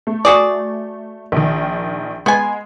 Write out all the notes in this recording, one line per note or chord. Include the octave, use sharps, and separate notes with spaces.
A3
F#4 G#4 D5
A#1 D#3
G#3 B3 G#5